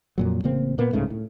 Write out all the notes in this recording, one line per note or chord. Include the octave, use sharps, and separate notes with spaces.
F2 A#2 F#3
A1 C#3 A#3 C4
A#2 A#3 B3
C2 G#2 C#3 A3
A2